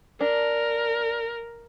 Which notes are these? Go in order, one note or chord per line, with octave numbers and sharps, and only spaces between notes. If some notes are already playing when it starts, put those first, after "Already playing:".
D4 A#4